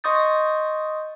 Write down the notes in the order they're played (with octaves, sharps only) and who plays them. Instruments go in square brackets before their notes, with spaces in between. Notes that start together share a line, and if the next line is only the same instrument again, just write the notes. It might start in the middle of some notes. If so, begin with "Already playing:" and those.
[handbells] D#5 C6 C#6 D#6 G6 A6